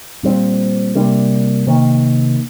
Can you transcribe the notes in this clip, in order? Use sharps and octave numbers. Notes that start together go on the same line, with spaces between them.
A#2 G3 C4
C3 G3 A#3 D4
C3 D#3 A#3